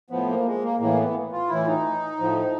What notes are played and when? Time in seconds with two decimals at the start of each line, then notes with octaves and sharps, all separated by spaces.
0.10 A2 F3 B3
0.28 A#3
0.45 G#3
0.63 A#3
0.80 A2 E3 A#3
0.97 B3
1.32 F4
1.49 A2 E3 E4
1.67 D#4
2.19 A2 F3